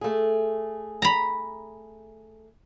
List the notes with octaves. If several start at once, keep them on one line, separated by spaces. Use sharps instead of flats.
A3 G#4
A#5 B5